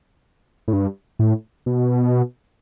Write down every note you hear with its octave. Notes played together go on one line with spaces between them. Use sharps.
A2
G2
A2
B2